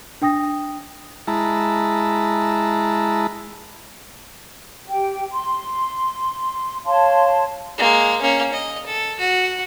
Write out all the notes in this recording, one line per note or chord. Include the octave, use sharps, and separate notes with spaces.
D4 G5 D#6 A#6
G#3 E4 A5 A#5
G4 G5
C6
C#5 F5 A5 C6
G#3 A#3
A#3 C#4
D#5
A4
F#4